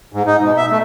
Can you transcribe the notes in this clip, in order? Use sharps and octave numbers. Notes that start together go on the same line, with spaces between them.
G#2
D#4
B2
E5
A3